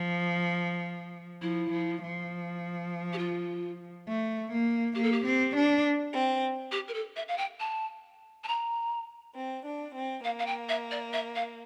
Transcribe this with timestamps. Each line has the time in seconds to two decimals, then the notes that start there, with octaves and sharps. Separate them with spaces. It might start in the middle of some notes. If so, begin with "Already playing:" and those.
Already playing: F3
1.42 F3 E4
1.71 F3
2.01 F3
3.13 G4
3.18 F4
4.07 A3
4.51 A#3
4.95 A#3 G4
5.03 A4
5.12 G4
5.24 C4
5.55 D4
6.13 C4
6.72 G4
6.88 A#4
6.94 A4
7.16 E5
7.28 F5
7.38 G5
7.60 A5
8.44 A5
8.48 A#5
9.37 C4
9.66 D4
9.95 C4
10.24 A#3 F5
10.39 F5
10.47 G5
10.69 E5
10.91 D5
11.13 E5
11.35 F5